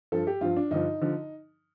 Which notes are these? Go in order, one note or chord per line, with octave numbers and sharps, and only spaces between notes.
G2 F3 A4
G4
G2 F3 F4
D4
G2 D3 F3 D#4
D3 F3